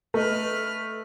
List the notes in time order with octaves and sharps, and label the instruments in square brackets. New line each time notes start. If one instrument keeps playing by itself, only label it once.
[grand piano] A3 D#5 [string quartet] B4 F6